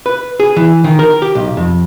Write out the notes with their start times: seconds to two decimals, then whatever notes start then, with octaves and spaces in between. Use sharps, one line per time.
0.06 B4
0.40 G#4
0.56 E3
0.84 D#3
0.99 A#4
1.22 G4
1.35 B1
1.57 F2